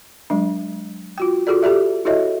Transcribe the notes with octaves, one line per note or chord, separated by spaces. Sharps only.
F#3 G#3 D4
F4 F#4 G5
F4 F#4 G#4 A4 D5
G4 A4 D5 E5
E4 F#4 A4 C#5 D#5 E5